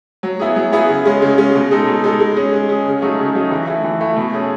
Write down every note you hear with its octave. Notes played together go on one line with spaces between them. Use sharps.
F#3
B3 E4 G#4
F#3
B3 E4 G#4
C#3
G#3 C#4
C#3
G#3 C#4
B2
G#3 D#4 A4
B2
G#3 D#4 A4
G#3
C#4 G#4
G#3
C#4 G#4
C#3
F#3 A3 D#4 G#4
C#3
F#3 A3 D#4 G#4
E3
A3 E4
E3
A3 E4
B2
A3 C#4 G#4